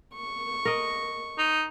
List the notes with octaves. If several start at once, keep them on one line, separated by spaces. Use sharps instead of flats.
C#6
A#4 D#5
D#4